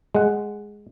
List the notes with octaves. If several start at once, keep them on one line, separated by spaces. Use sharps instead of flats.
G#3 F#5